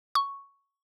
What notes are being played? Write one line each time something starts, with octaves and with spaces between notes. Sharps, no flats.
C#6